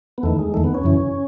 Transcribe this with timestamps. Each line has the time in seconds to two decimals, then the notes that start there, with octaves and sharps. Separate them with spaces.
0.18 B3
0.23 E2 D#3 A3
0.39 G#3
0.54 E2 D#3 A3
0.64 B3
0.75 C#4
0.84 F#2 C#3 E3